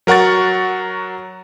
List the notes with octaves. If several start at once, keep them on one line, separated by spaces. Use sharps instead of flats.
F#3 A#4 F#5 C#6 A6